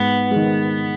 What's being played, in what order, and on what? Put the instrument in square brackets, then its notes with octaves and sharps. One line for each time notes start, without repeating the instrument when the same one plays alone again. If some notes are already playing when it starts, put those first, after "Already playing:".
Already playing: [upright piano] G#2 [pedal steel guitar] B3
[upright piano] G#3
D#3